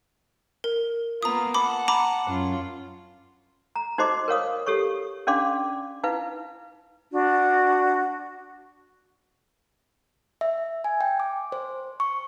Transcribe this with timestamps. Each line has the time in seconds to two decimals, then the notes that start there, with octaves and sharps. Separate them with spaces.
0.64 A#4
1.23 A#3 B3 F4 A#5 D#6
1.54 F#5 A5 B5 D6
1.88 A#5 B5 D6
2.27 F#2 F4
3.76 A#5
3.98 D#4 F#4 C5 D#5 C6 D6
4.28 A#4 C#5 F5 D#6
4.66 G4 A4 C#5 C#6
5.27 C#4 D4 D5 F5 C6 D6
6.03 D#4 E4 B4 F5
7.11 D4 F#4
10.41 E5
10.84 G#5
11.01 G5
11.20 D6
11.52 C5
12.00 C#6